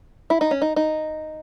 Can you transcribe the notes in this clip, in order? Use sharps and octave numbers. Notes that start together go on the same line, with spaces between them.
E4
D#4
C#4
D#4
D#4